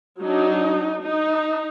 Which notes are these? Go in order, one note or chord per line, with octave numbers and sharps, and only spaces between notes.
F#3 D4 D#4
D#4